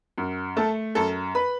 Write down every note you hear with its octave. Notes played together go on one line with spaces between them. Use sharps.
F#2
A3 A4 A5
F#2 A4 A5
B4 B5